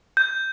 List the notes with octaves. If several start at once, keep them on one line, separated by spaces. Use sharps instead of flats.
G6